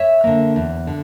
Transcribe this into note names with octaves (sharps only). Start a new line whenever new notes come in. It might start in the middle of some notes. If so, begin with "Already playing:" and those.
Already playing: C#5 E5
D3 A#3
E2
D3